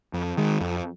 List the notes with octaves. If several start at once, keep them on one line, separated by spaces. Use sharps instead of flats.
F2
D#3 G#3
F2